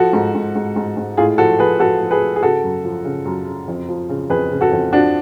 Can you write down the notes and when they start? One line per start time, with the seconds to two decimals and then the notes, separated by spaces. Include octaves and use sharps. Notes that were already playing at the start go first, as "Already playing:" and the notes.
Already playing: F3 F#4 A4
0.13 G#2
0.35 G#2
0.55 G#2
0.76 G#2
0.97 G#2
1.17 A2 F4 G#4
1.38 F3 F#4 A4
1.59 F3 G#4 B4
1.79 F3 F#4 A4
2.01 F3
2.11 G#4 B4
2.22 F3
2.36 G#4
2.43 C#3 F#4 A4
2.64 F#2
2.84 F3
3.05 C#3
3.25 F#2
3.47 C#3
3.68 F2
3.89 F3
4.09 C#3
4.30 F2 G#4 B4
4.51 C#3
4.61 F#4 A4
4.72 F2
4.92 F3 D4 F#4